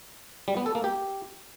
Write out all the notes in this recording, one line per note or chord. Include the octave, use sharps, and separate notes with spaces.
G3
B3
A4
A#3
G4